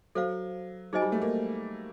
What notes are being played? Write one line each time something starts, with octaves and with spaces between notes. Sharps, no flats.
F#3 A4 C5 F5
F#3 D#4 G#4 C5 D#5 G#5
G3
A3
A#3